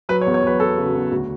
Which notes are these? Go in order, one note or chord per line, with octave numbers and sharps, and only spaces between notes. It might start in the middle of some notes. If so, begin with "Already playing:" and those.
F#3 B4
C#5
E2
C#5
F#3 B4
E2 A4
C#3
F#4
E2
D2 F#4